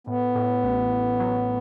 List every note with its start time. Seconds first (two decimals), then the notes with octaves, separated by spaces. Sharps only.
0.07 A2 B3
0.35 A2
0.64 A1
0.92 A1
1.20 F#3